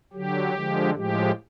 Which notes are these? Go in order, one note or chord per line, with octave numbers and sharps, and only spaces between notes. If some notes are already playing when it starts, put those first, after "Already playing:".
D3 F#3 G4
D3 F3 G#3
A2 F3 G#3 G4